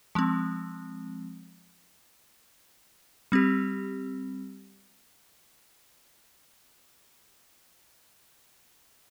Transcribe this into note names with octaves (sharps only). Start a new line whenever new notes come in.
F3 G#3 C4
G3 C4 G4